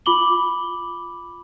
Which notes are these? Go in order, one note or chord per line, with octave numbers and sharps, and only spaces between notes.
F4 B5 D6 F#7 G7